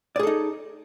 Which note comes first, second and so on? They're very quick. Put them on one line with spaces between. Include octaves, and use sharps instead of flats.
D5 G#4 A4 D#4